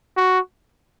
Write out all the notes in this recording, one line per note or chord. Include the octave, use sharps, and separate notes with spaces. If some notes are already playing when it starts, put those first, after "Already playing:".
F#4